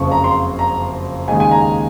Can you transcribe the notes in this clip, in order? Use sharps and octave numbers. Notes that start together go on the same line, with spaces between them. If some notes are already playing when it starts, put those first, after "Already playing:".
Already playing: F#1 F2 C#3 C#6
A#5
C6
A#5
D#2 C#3 G#3 D#4 G#5
G#5
A#5